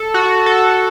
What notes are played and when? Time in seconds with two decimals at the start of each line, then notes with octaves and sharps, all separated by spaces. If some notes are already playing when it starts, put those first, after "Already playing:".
Already playing: A4
0.14 F#4
0.46 A4